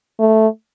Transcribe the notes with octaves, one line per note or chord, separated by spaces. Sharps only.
A3